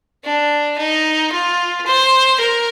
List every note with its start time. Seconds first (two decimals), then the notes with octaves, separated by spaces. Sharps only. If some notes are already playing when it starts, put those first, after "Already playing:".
0.24 D4
0.78 D#4
1.31 F4
1.86 C5
2.40 A#4